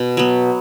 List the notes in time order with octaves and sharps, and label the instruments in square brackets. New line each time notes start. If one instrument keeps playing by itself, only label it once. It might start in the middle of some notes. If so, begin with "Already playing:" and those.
Already playing: [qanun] B2
F#3 B3